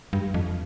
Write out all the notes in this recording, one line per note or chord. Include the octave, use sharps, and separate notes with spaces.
G2
F2